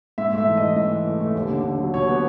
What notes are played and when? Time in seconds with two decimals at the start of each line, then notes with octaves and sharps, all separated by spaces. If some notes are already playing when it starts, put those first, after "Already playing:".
0.18 G#2 E5
0.33 A3 E5
0.47 E3
0.57 D#5
0.62 E3
0.76 G#2 D#5
0.91 E3
1.06 A3
1.20 A3
1.35 D#2
1.50 D3
1.64 D3
1.79 F#3
1.94 D#2 C#5
2.08 B3